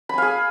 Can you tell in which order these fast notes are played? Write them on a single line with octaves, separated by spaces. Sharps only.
B5 G#5 F5 G#4